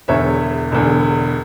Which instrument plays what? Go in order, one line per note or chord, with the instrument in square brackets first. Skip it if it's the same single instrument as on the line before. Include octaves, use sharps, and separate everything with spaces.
[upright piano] E1 E2 D3 C#5 E5
E1 E2 D3